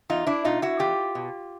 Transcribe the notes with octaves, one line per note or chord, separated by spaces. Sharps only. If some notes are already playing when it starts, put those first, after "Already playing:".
E2 D#4 F4
D4 E4
B2 D#4 F4
E4 F#4
E2 F4 G4
B2